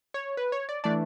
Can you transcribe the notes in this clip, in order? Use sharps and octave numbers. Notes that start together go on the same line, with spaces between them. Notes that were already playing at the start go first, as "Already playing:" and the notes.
C#5
B4
C#5
D5
E3 A3 D4 D5